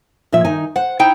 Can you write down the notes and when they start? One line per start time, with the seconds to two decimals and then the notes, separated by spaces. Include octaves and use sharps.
0.32 A#2 F3 E5
0.45 D#3 D#4 G#5
0.76 C5 F#5
0.99 D#4 E4 G5